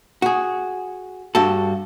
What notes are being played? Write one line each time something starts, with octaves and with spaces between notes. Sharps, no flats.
F#4 G#4
G2 F#4 A4